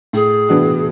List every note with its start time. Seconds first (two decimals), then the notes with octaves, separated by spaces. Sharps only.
0.13 A2 G#4
0.49 E3 B3 D4 F#4